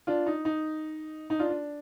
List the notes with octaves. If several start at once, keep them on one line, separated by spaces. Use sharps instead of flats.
D4 F4
D#4
D#4
D#4
D4 F4
D4